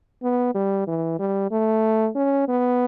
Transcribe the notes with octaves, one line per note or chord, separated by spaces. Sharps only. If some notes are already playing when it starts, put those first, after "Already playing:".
B3
G3
E3
G3
A3
C#4
B3